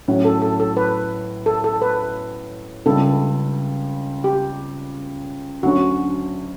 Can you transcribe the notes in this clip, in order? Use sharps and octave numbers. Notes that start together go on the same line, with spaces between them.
A2 F#3 C#4 F#4
A4
A4
A4
B4
A4
A4
B4
C#2 C#3 G3 A4
G4
D2 D3 F#3 C#4 F#4